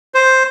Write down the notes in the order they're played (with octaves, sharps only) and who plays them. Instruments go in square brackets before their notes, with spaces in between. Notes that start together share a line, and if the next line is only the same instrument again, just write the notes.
[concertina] C5